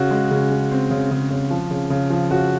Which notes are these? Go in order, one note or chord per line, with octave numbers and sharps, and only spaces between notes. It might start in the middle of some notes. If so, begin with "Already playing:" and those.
Already playing: C#3 F#4
G#3
C#3
G#3
C4
C#3
C#3
C#3
F3
C#3
C#3
F3
C#3 F#4